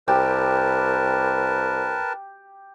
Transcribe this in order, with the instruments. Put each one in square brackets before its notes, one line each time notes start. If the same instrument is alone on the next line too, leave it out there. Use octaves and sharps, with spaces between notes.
[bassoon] C2 [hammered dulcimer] G4 [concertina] A#4 B4 A5